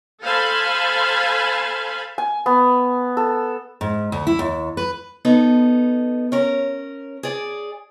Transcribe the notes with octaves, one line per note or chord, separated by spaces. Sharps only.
A4 C5 F5 G#5 A5 B5
G#5
B3
A4
G#2
D2
E4
D#2
B4
B3 D#4 A4
C#4 A#4
G#4 D5